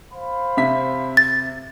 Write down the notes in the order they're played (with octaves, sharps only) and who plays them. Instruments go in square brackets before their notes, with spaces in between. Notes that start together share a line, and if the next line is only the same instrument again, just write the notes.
[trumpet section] C5 F5 B5
[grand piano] C3 E5 B6
[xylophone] A6